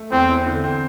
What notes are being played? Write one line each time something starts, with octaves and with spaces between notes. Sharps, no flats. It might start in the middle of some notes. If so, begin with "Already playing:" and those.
Already playing: A3
E2 C4
E3
D3
C4